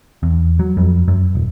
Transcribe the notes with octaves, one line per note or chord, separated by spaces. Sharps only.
E2
F#3
F2
F#2
D#1